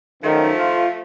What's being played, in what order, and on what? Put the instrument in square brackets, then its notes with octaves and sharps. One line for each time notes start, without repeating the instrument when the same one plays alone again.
[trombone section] F#2 D#3 [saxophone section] F3 A3
[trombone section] F4